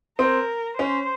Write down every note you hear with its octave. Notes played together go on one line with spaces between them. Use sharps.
C4 A#4
C#4 C5